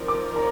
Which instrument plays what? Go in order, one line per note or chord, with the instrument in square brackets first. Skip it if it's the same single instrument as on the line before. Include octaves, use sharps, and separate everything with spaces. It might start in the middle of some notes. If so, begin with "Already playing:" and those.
Already playing: [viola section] F3 C4 D#4 A#4 D5
[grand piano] D6
A#5